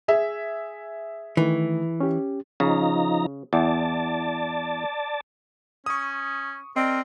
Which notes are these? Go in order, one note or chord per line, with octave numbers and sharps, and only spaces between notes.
G#4 E5
D#3 E3 A3
C#4 G4
C#3 F3 D#4 A#5
E2 D5 A5
C#4 C#6 D#6
C4 A#4 D5 D#5